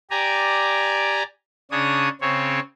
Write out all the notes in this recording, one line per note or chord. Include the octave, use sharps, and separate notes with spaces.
G4 D5 G#5 A#5
C#3 D4 C#5 D#6
C#3 C4 C#5